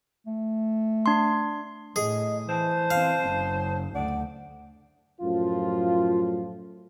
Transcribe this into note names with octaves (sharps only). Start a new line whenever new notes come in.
A3
D4 C6
A2 G#4 D#5
E3 C5 A5
E3 C4 F5
F#1 C#3
D2 D5 F#5
F#2 A2 F3 F4